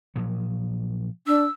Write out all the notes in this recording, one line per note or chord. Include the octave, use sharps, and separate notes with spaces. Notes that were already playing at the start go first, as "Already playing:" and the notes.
A#2 F3 F#3
D4 E6